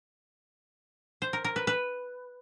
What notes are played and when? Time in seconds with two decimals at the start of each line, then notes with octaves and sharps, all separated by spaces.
1.22 C5
1.33 A#4
1.44 A#4
1.56 B4
1.67 B4